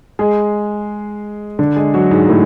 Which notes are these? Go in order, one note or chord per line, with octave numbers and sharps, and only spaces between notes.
G#3 G#4
D3 D4
G#3 G#4
F#3 F#4
G#2 G#3
A2 A3